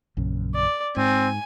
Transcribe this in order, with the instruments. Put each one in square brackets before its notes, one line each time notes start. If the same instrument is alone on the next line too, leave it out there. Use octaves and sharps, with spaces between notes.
[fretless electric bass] A#1 F#2 C#3
[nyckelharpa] D5
[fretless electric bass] G#2 [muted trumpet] C4 [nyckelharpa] G#5